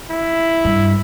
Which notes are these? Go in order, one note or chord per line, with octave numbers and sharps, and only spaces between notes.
E4
G2